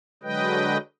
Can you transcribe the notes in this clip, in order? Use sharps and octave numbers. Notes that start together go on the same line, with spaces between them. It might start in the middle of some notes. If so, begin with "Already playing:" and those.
D3 F#3 G#3 B4 D#5 G5